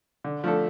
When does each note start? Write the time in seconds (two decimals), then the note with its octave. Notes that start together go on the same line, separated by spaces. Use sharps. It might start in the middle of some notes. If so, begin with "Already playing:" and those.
0.24 D3
0.44 F3 A3 D4 A4